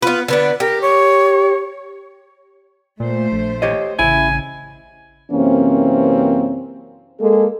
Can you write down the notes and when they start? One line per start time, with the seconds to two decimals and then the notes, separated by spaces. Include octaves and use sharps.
0.02 B3 F4 B4
0.28 D3 B3 D4 B4
0.60 G4 A#4
0.81 C#5
3.00 A#2 A3 C5
3.32 A#1
3.62 G4 C#5 D#5
3.99 A1 C#3 E4 G#5
5.32 F#2 C3 E3 A#3 C4 C#4
7.21 G#3 A#3 G#4 A4